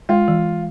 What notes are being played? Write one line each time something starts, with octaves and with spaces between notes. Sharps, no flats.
G#3 F4
E3